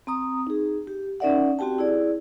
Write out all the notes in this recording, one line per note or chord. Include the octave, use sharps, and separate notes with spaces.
C4 A#5 D#6
D#4 G#4
G4
C#4 D#4 A#4 D5 E5 F#5
C4 F#4 G4 G5 A5
E4 G#4 D5